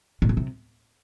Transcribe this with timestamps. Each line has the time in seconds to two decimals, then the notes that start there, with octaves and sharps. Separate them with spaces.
0.22 A2
0.29 B2
0.37 C3